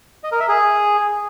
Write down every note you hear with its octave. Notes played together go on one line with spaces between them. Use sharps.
D#5
A#4
E5
G#4